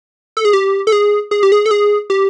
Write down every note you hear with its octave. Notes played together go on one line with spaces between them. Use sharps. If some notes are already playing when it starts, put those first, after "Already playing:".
A4
G#4
G4
A4
G#4
G#4
G4
G#4
A4
G#4
G4